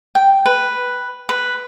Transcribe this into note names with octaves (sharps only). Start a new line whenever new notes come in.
G5
B4
B4